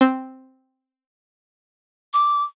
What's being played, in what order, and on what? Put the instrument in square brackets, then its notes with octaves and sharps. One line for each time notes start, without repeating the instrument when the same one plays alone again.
[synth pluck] C4
[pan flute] D6